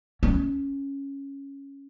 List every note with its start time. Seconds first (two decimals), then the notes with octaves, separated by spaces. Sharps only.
0.23 C#4